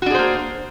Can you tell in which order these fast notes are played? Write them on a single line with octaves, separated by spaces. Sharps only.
F#4 D4 G#4 C5 A#3